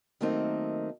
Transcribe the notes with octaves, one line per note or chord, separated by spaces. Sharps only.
D#3 F#3 A3 A#3 C4 D#4